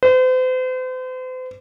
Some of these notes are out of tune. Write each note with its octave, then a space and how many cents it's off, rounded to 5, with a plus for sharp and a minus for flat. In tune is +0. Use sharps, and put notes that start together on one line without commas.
C5 -40